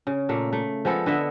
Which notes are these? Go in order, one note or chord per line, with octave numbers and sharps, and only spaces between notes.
C#3
A#2 A3 A#3
A3
F3 G#3 B3 A4
D3 B3 D#5 E5